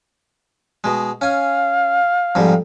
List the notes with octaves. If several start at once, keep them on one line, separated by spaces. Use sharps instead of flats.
B2 G#3
C#4 F5 G#5
F2 G#2 G3